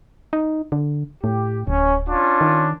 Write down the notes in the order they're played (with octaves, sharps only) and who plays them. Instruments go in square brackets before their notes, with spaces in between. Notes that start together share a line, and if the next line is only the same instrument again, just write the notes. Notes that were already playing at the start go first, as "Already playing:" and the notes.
[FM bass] D#4
D3
[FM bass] A2 [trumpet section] G4
[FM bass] D1 [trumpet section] C#4
[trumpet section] C#4 D4 F4
[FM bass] D#3